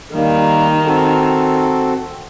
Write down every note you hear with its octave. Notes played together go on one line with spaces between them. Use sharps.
D#3 G3 A#3
C4 F#4 A4